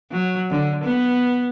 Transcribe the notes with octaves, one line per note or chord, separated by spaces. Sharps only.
F#3
D3
B3